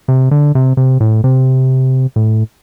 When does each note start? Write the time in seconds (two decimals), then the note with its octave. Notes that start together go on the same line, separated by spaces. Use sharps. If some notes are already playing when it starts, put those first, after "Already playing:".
0.08 C3
0.31 D3
0.55 C3
0.77 C3
1.00 A2
1.24 C3
2.16 A2